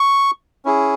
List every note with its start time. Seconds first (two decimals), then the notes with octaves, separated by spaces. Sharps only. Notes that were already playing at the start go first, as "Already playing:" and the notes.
Already playing: C#6
0.65 C#4 E4 G#4